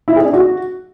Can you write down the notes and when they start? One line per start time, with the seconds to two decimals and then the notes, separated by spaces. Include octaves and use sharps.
0.08 E4
0.16 G#4
0.25 D4
0.33 F#4